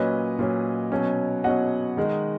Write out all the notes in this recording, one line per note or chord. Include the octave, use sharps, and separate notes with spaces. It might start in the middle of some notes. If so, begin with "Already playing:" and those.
Already playing: A#2 F#3 C#4 B4 D#5
A#2 F#3 C#4
B2 F#3 C#4
B2 F#3 C#4 D#5 F#5
D#3 G#3 D#4